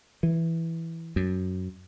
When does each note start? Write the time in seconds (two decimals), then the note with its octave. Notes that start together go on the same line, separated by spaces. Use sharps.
0.23 E3
1.16 F#2